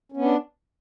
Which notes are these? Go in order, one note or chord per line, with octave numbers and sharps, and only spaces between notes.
B3 C#4 D4